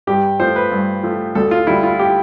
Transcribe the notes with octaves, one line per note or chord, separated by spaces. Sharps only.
G2 G4
F3 A3 C5
B4
G2
F3 A3
D2 A4
F4
D3 G3 E4
F4
G4